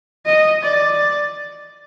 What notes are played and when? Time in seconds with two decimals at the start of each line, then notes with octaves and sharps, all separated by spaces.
0.26 D#5
0.63 D5